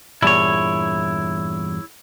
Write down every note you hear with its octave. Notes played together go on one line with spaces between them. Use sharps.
E2 G2 A#2 E4 C#5